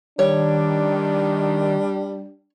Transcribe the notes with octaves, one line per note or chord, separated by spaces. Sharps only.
D#3 G3 D4 C#5